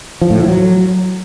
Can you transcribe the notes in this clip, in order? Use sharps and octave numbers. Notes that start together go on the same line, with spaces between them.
F3
A2
F3
F#3